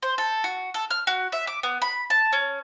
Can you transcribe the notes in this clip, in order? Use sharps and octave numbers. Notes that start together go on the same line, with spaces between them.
C5
A4
F#4
A4
F6
F#4
E5
D6
B3
B5
A5
C#4